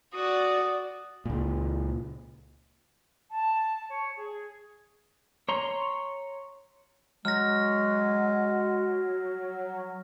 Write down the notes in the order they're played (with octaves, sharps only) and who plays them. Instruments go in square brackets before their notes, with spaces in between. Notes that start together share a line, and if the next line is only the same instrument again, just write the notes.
[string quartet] F#4 D5 [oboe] D#6
[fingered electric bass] C#2 A#2
[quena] A5
C#5
G#4
[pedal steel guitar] C#5 A#5 C6
[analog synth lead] F#3 [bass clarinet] G#3 [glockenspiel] F6 A#6